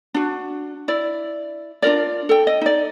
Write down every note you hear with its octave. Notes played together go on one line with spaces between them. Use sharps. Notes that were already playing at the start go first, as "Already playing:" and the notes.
D4 F#4
E4 D5
D4 F4 A#4 D5
A4 G5
D#5
D#4 D5